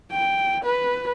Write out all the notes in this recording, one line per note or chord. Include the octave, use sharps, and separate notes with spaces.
G5
B4